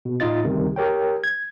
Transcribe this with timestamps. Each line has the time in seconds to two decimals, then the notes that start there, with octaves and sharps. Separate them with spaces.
0.05 B2
0.20 A2 D#4 F4 D#5 A6
0.44 D2 C3 D#3 G3
0.76 G4 A#4 C#5 G5
1.24 G#6